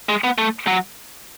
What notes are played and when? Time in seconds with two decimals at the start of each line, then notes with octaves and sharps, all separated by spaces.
0.09 G#3
0.24 B3
0.38 A3
0.67 F#3